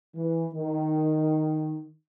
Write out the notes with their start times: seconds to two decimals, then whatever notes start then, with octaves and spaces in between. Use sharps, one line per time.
0.15 E3
0.53 D#3